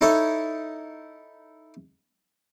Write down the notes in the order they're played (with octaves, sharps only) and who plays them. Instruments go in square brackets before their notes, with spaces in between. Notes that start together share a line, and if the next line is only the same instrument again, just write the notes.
[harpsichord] D#4 E4 A4 C#5 D#5